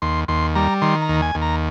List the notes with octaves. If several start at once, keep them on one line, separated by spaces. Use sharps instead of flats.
D#2 C6
D#2 C6
G3 A#5
D#3 C6
A#5
D#2
G#5
D#2
A#5